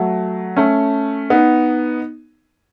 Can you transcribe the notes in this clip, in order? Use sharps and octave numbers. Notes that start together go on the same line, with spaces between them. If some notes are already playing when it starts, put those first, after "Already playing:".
Already playing: F#3 A3
A3 C#4
B3 D#4